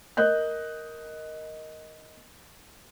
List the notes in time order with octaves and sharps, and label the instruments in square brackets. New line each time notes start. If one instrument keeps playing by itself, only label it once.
[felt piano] A#4 D#5 F#6 G6